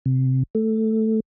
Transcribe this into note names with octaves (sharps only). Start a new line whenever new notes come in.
C3
A3